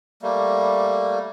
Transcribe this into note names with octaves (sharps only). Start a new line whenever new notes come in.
G3 A3 A#3